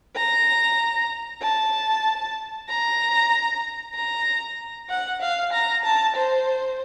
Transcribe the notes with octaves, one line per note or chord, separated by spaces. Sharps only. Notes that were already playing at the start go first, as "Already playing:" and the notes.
A#5
A5
A#5
A#5
F#5
F5
A#5
A5
C5